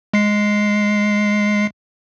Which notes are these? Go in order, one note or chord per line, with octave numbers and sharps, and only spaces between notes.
G#3 C7